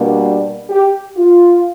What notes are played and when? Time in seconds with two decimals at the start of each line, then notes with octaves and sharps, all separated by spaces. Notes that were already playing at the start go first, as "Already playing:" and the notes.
Already playing: B2 G3 A#3 D4
0.70 G4
1.17 F4